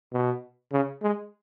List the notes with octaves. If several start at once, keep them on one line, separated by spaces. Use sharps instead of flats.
B2
C#3
G#3